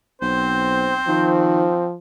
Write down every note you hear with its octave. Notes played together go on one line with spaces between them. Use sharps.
B1 C4 C5
D#3 F3